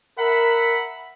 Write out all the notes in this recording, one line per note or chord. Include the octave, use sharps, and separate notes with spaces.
A#4 E5 F#5 B5